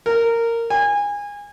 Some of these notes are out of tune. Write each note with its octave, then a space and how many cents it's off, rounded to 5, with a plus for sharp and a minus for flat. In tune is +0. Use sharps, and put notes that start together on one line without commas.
A#4 -15
G#5 -25